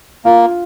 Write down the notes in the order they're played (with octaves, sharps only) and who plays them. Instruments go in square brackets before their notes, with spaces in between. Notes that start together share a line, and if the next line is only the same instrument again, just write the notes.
[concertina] A#3 [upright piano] F4